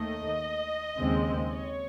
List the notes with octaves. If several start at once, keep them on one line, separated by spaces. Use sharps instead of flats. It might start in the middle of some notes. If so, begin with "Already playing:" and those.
Already playing: D#2 D#3 A3 D#5
D#2 C#3 G#3 C4
C#5